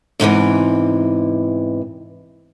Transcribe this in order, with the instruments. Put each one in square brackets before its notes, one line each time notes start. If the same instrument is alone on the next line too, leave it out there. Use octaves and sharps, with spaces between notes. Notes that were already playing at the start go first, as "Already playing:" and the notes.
[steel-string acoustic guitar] E2 G#2 C3 E3